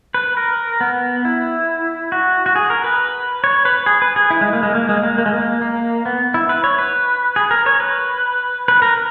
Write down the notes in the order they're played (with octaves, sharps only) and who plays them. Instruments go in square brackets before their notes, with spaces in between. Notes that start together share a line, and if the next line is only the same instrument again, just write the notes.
[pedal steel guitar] B4
A#4
B3
E4
F#4
F#4
G#4
A#4
B4
C#5
B4
G#4
B4
G#4
E4
G#3
A#3
G#3
A#3
G#3
A#3
A#3
G#3
A#3
A#3
B3
E4
B4
C#5
B4
G#4
A#4
C#5
B4
B4
A#4